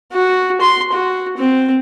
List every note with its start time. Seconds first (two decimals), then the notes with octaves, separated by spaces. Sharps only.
0.13 F#4
0.61 C6
0.93 F#4
1.37 C4